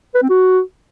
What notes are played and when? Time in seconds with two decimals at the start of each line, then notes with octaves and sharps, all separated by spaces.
0.15 B4
0.22 C4
0.30 F#4